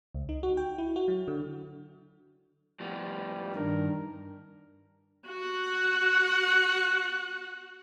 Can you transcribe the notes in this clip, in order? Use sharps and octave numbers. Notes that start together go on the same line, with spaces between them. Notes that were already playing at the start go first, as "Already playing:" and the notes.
C#2
D#4
F#4
G5
E4
F#4
F#3
D3
A2 F3 G3 B3
G2 D#3 D4 A#4
F#4 F#5